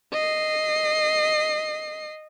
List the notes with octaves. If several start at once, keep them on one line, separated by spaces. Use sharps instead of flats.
D#5 C7